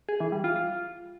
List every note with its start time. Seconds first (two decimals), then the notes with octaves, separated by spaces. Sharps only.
0.09 G#4
0.20 E3
0.32 G3
0.44 F4
0.56 F4